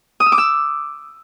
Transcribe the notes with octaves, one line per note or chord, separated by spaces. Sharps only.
D#6
E6
D6
E6